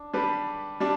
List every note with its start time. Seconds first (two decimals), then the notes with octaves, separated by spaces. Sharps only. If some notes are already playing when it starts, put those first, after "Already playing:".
Already playing: D4
0.13 G3 D4 G4 B4
0.80 G3 D4